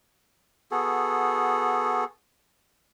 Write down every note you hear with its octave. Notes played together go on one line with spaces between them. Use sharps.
B3 F#4 G#4 A4